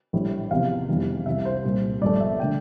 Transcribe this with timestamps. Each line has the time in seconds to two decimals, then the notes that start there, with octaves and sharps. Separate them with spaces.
0.13 A#1 A2 E3 G3
0.51 E2 C3 F3 F5
0.89 F1 E2 E3 G3
1.26 C2 C3 E3 E5
1.45 C5
1.64 C2 A#2 G3
2.01 G1 G2 F3 A3 D5
2.20 E5
2.40 D3 A3 G5